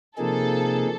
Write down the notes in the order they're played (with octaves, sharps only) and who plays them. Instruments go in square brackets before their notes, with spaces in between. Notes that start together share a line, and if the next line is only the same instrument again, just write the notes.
[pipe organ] C3 F3 A#3 D#4 G#4 [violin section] A4